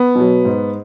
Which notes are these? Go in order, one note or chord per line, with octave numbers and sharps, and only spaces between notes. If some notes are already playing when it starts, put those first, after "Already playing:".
Already playing: B3
B2 F#3
G#2